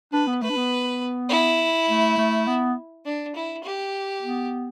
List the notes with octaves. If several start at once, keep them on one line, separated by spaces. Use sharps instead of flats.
D4 B4
B3
A3 B4
D4
B3
E4
A3
A3
B3
D4
E4
G4
B3